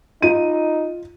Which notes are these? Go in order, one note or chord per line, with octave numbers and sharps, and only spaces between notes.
D#4 F4 D#7